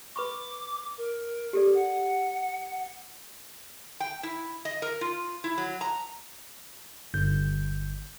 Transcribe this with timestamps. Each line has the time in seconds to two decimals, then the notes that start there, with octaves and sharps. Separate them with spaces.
0.16 B4 B5 C#6 D6
0.98 A#4
1.53 G4 A4 D5
1.74 F#5
4.00 G5
4.23 E4
4.65 D#5
4.82 A#4
5.01 F4
5.44 E4
5.58 F#3
5.81 A#5
7.14 G1 G6